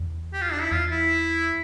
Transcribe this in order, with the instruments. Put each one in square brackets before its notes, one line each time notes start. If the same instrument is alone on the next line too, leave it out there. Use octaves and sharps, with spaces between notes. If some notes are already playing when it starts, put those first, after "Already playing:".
Already playing: [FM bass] E2
[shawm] G4
F4
D4
E4
[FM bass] E2 [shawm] F4
[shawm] E4